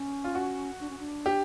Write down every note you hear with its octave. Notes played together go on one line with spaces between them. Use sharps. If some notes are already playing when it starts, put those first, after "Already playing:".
Already playing: C#4
F4
F#4
D4
C#4
D4
G4